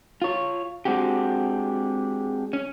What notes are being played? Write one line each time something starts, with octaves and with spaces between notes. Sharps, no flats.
F4 C#5
G#3 C4 D4 F#4 G4
C#4